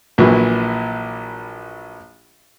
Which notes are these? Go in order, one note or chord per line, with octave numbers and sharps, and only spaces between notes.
A#1 A#2 E3 F#3